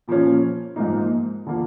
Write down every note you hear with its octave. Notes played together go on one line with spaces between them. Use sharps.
A#2 F3 A#3 C#4
G#2 F3 A#3 D#4
D3 F3 A#3